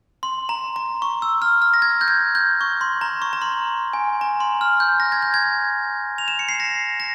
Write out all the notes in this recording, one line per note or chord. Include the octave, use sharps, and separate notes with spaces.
C6
A#5
A#5
C#6
E6
F6
F6
A#6
G#6
G6
G#6
G6
C#6
C6
A#5
C#6
A#5
C6
G#5
A#5
C6
F6
G6
A#6
G#6
G6
G#6
F7
E7
C#7
C7
A#6
A#6